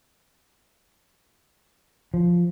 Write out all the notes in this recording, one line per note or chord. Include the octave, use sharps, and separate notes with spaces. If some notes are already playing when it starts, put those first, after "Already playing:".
F3